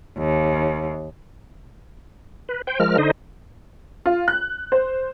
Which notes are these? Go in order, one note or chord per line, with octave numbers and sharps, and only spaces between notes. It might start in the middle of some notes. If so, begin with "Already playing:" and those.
D#2
B4
C5 G5
F3 G#3 A#4 F6
D3 D#4 C5 D#5
F4
F#6
C5